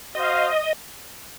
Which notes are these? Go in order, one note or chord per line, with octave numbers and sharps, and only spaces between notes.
F#4 C5 D#5 F5